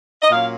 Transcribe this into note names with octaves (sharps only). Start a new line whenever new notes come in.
D#5
A#2 F#3 A#3 C#4 F5